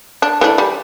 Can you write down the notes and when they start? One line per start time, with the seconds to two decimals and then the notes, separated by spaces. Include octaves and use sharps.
0.22 D4
0.41 E3 A3 D4
0.58 G3